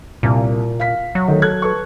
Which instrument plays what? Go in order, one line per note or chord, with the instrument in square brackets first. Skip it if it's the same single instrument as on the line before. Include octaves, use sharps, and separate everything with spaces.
[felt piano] C2 [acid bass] A#2
[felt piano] F5 B6
[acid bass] F#3
[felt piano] D#3 A3
A4 F#6 G#6
A4 B4 C#6